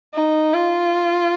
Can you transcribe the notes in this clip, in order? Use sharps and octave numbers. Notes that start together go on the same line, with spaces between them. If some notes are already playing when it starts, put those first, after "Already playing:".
D#4
F4